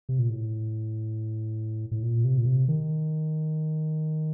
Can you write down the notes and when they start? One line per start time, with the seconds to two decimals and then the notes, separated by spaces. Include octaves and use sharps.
0.09 C3
0.19 A#2
0.30 A2
1.91 A2
2.03 A#2
2.25 C3
2.38 A#2
2.45 C3
2.68 D#3